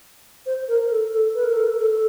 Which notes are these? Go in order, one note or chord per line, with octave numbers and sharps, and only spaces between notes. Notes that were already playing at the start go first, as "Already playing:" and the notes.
C5
A#4
A4
A4
B4
A#4
A4
A#4
A4
A4